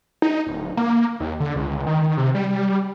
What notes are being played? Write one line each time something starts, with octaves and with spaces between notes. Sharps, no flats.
D#4
D1
A#3
D#2
D3
C#2
D#3
C3
G3